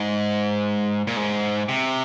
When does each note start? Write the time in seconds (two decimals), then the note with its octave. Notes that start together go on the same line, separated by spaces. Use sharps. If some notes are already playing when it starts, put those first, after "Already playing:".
Already playing: G#2
1.07 A#2
1.17 G#2
1.69 C3